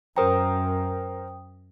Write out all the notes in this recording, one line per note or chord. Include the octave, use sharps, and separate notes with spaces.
F#2 A#4 C5 G5 A#5 D#6